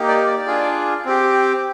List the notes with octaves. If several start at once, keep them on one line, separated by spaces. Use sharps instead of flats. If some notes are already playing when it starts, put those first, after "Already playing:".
Already playing: A#3 D#4 G4
D5
D5
D4 F4 G#4
C4 G4